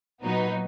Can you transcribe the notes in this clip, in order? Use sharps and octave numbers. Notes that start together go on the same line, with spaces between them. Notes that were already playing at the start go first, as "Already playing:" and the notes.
A#2 F#3 B3 D#4